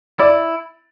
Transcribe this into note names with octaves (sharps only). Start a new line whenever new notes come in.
E4 D5